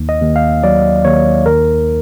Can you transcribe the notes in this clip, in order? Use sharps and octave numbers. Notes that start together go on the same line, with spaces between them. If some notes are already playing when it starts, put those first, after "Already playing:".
Already playing: D#2
D#5
D#2
F5
F#3 D5
D#2 C#5
D#3 A#4